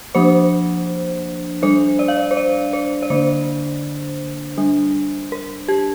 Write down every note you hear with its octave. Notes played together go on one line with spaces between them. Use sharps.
F3 A#3 D4 C5
G3 D4 C5
D5
F5
D5
C5
D5
C5
D5
D3 A#3 D4 C5
G3 D4
A#4
G4